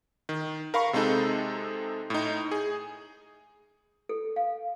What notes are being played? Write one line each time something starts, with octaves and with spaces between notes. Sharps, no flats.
D#3
A#4 F5 B5 C#6
C3 G#3 C4 D#4 A4
A2 D#4
G#4
A4
F5